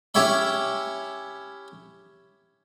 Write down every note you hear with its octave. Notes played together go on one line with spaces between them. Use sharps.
C#4 E4 G4 C#5 E5 B5